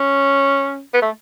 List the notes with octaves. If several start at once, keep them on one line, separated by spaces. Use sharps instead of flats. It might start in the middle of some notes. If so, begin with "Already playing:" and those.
Already playing: C#4
B3
A3